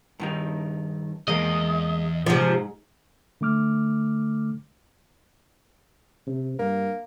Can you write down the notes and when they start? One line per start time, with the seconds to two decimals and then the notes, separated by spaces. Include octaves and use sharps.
0.20 G2 D#3 D#4
1.28 E2 G#3 A#3 D#5
2.26 G#2 C3 F3 G#3
3.41 D3 A3 D6 F6
6.27 C3
6.59 G2 A#3